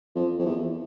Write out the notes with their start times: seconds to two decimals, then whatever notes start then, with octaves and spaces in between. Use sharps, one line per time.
0.15 F2
0.38 F2
0.46 E2